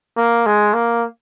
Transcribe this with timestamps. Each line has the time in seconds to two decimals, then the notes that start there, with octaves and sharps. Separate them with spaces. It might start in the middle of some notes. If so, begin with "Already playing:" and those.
0.17 A#3
0.46 G#3
0.74 A#3